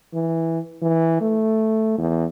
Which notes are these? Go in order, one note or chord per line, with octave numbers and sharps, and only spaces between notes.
E3
E3
A3
E2